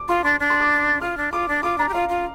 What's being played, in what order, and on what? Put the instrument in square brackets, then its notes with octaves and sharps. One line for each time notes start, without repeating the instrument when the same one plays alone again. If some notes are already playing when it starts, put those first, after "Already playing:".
Already playing: [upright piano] D6
[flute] F4 [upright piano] C6
[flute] D4 [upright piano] C6
[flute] D4
[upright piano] C6
D6
[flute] F4 [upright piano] F6
[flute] D4
[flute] F4 [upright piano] D6
[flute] D4
[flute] F4 [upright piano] D6
[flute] D4 [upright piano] A#5
[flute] G4
[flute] F4 [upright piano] F5
[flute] F4